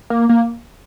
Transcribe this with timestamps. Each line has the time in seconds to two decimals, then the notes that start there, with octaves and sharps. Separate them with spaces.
0.10 A#3
0.29 A#3